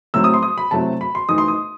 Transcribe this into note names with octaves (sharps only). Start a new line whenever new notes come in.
A2 F#3 A3 C4 E6
D#6
C6
D#6
B5
C3 F#3 A3 C4 E4 A5
B5
C6
E3 A3 D#4 D#6
C6
D#6